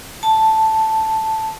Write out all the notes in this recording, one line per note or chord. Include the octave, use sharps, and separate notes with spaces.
A5